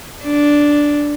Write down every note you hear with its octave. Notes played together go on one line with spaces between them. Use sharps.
D4